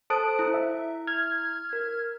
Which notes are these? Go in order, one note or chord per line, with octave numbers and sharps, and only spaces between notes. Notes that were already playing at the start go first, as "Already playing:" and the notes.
A4 C5 A5 D#6 F#6 D7
E4
E5
F6 G#6
A#4